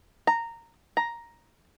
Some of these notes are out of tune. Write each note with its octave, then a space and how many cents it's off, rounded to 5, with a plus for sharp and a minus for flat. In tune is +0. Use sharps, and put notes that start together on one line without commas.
A#5 -15
A#5 +5